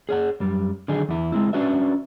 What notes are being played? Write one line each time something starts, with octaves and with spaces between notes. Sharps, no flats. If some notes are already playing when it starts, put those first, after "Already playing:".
G#4 C#5 F5 F#5
F#2 G3
D3 D#3 F#3 D#4 G#4
E2 E4
G#3 C4 E4
C#4 D4 F#4 B4 E5